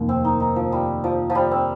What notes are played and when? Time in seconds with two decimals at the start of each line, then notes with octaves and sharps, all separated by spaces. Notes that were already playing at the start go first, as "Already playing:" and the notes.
Already playing: F1 D#2 D#3 A#3
0.09 C4
0.25 D#4
0.40 D#4
0.56 F3
0.72 G3
1.04 F3
1.30 F3
1.35 G3
1.51 C4